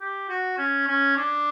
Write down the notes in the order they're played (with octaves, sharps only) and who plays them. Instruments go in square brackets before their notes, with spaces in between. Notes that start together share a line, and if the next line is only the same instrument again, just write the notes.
[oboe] G4
F#4
C#4
C#4
D4